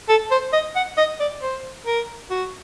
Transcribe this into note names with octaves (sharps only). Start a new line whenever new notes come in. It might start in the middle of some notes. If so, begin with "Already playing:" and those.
A4
C5
D#5
F#5
D#5
D5
C5
A#4
F#4